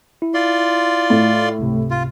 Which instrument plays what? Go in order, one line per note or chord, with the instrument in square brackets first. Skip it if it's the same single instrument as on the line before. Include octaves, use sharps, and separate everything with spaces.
[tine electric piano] E4
[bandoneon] F4 D5 C6
[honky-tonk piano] A2
[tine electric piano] C#2 G#2 C3
[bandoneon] F4